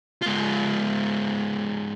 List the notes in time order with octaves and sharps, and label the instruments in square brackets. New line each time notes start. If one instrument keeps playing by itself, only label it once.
[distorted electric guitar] G#2 F4